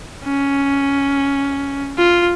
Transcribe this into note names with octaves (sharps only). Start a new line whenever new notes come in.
C#4
F4